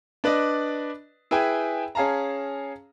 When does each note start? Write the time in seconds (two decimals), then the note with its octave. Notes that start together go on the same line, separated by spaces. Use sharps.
0.24 D4 B4 D5 D#5
1.31 E4 G#4 B4 G5 G#5
1.95 C#4 G#4 F5 A5 A#5